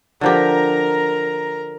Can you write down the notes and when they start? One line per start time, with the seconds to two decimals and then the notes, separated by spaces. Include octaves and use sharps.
0.21 D3 F3 G4 A#4 A#5